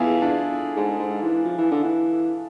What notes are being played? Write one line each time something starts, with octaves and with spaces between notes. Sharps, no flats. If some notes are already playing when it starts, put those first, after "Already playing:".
Already playing: E2 E4 F4 G#4 A4
D4 F4
G#2
G#2
E3
F3
E3
D3
E3